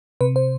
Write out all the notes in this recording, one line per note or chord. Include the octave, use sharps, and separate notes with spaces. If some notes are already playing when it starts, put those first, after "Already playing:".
C3 B4
C5